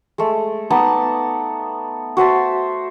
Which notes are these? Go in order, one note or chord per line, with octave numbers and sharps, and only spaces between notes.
G#3 A3
B3 D#4 D5 A5
F#4 C5 E5 A5